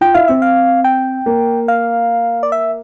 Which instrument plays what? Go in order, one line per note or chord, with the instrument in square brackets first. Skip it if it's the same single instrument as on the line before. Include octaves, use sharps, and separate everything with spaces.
[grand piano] F4 [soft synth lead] G5
[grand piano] E4 [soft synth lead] F5
[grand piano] C4 [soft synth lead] E5
[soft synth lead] F5
G5
[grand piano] A#3
[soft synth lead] F5
D5
E5